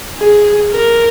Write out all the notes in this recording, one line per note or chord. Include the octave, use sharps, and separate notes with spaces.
G#4
A#4